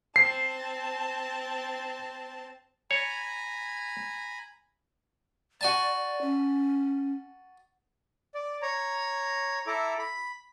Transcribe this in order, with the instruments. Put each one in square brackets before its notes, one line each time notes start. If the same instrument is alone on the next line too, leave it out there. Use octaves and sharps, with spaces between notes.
[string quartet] C4 A5 [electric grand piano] C7
[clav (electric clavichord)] C#5 [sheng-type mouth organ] G#5 A#5 B5
[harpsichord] F#4 G#5 A5 [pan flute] D5
[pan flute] C#4
[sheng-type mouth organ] D5
C#5 A#5
E4 A4 A#5 D6
B5